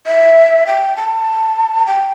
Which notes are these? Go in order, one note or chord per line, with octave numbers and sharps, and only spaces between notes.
E5
G5
A5
G5